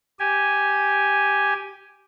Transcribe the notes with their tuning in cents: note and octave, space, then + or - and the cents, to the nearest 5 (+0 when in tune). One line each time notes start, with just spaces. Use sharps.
G4 +0 G#5 +0